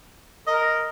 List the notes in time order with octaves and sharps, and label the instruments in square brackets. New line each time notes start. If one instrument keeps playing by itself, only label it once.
[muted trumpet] A#4 [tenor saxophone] D#5